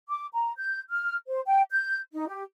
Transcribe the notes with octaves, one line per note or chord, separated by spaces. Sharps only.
D6
A#5
G6
F6
C5
G5
G6
D#4
G4